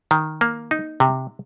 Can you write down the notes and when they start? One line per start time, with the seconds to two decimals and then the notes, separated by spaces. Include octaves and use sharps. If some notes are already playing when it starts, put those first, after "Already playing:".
0.11 D#3
0.41 A#3
0.71 D#4
1.00 C3